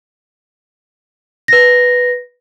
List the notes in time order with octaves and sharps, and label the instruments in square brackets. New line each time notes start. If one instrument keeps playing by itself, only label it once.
[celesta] B4 A#6